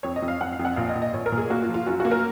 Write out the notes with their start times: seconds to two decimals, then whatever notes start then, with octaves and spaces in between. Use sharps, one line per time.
0.03 F2 C#5
0.16 D#5
0.22 F2
0.28 F5
0.41 F2 F#5
0.52 F5
0.59 F2
0.65 F#5
0.76 A#1 F5
0.89 D#5
0.95 A#1
1.02 D#5
1.13 A#1 C#5
1.26 A#4
1.32 A#2
1.37 G#4
1.50 A#3 F#4
1.62 F4
1.68 F3
1.74 F4
1.86 F#2 F#4
2.00 F#4
2.05 A#3
2.11 A#4